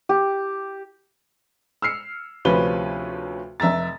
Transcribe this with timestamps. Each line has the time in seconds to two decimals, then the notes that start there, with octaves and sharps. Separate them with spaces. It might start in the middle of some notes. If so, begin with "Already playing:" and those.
0.09 G4
1.82 E6 F6 C7 C#7
2.45 D2 C3 F3 C#4 B4 G7
3.60 F1 E5 A#5 A6